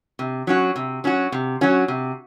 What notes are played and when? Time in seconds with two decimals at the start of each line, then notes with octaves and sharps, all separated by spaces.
0.19 C3
0.47 F#3 C#4 F#4
0.76 C3
1.04 F#3 C#4 F#4
1.32 C3
1.61 F#3 C#4 F#4
1.88 C3